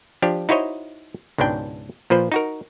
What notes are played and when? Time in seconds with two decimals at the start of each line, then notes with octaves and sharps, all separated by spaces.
0.22 F3 D4 G4
0.49 D#4 E4 F#4 C5 C#5 D#5
1.38 C#2 G#2 B2 D4 G5
2.10 A#2 F3 B4 C5
2.32 D#4 F#4 A#4